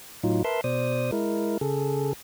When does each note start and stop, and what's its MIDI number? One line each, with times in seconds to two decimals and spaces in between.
0.23 0.43 45
0.23 0.43 54
0.23 0.43 63
0.23 0.43 65
0.44 0.61 70
0.44 0.61 71
0.44 0.61 76
0.44 0.61 81
0.44 0.61 84
0.64 1.11 47
0.64 1.11 72
0.64 1.11 74
0.64 1.11 87
1.12 1.58 56
1.12 1.58 64
1.12 1.58 70
1.61 2.13 49
1.61 2.13 68
1.61 2.13 69